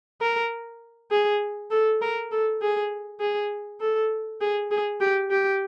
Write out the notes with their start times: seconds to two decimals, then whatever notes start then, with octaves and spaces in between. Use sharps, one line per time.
0.21 A#4
1.11 G#4
1.71 A4
2.01 A#4
2.31 A4
2.62 G#4
3.20 G#4
3.81 A4
4.41 G#4
4.71 G#4
5.01 G4
5.31 G4